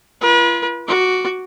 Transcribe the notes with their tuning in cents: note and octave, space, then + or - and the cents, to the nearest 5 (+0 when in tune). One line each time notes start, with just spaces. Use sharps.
F4 -40 B4 -40
F#4 +0 D6 -10